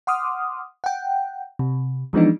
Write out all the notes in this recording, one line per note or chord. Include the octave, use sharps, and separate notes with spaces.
F#5 C6 D6 D#6 F6
F#5 G5
C3
E3 F3 G#3 B3 D4 D#4